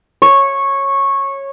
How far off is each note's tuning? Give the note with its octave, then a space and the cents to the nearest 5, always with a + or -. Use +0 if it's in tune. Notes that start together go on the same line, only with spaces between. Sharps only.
C#5 -15